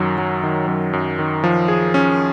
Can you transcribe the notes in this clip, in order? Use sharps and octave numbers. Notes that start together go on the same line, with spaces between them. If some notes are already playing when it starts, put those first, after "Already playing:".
Already playing: F#2 D#3 F#3
F#3
D#3
F#2
F#2
D#3
F3
G#4
C#4